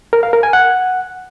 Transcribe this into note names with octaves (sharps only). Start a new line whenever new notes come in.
A#4
F5
A#4
G#5
F#5